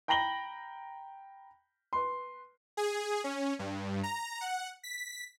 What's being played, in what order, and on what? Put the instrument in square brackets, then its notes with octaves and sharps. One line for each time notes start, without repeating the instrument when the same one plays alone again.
[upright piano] G5 A#5 B5 A#6 F#7 G7
B4 C6
[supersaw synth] G#4
C#4
G2
A#5
F#5
B6